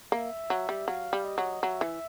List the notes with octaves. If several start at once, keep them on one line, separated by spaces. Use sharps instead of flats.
A#3 E5
F#3
G3
F#3 F5
G3
D#5
F#3
F#3 E5
E3